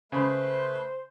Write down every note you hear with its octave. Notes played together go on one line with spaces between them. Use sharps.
C#3 A3 B4 C5 B5